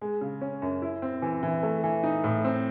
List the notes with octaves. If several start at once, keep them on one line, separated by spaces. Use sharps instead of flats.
G#3
C#3
C#4
F#2
E4
C4
E3
E3
A3
E3
D#4
A2
C4